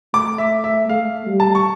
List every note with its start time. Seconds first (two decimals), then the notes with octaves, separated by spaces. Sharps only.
0.14 A3 D6
0.38 E5
0.64 E5
0.89 A3 F5
1.27 G3
1.40 A5
1.55 C#6